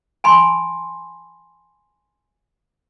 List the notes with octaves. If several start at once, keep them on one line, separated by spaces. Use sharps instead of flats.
G#5 A5 B5 C6